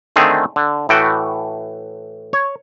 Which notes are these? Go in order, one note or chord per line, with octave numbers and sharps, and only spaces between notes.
D3 D#3 A3 C4 G#4
D3
A2 E3 A3 F#4 G5
C#5